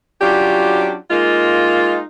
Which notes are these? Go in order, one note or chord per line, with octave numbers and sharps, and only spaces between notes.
F#3 C#4 D4 F4 G4
G#3 A#3 D#4 F4